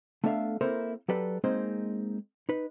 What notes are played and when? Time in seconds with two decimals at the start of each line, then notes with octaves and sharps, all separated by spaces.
0.24 A3 B3 D4 A4 E5 F5
0.61 A#3 C4 E4 A4 A#4 C5
1.08 F#3 G4 A4 B4 D5
1.44 G#3 A#3 C4 D#4 G#4 C5
2.49 D#4 B4